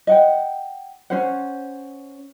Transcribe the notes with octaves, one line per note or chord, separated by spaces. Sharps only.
D#5 F#5 G5
C#4 C5 F#5